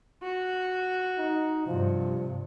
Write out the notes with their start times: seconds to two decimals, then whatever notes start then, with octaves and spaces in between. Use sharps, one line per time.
0.23 F#4
1.18 D#4
1.67 G2 C3 F3